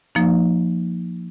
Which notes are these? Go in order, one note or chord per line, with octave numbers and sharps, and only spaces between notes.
F3 A#3 D#4